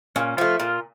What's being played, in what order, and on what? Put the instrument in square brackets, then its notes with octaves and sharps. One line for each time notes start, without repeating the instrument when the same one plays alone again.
[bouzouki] A#2 [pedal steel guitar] C#4
[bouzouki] F3 A3 [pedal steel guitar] F4
[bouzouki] A#2 [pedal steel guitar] F4